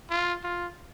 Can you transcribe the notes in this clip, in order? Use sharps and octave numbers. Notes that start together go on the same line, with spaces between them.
F4
F4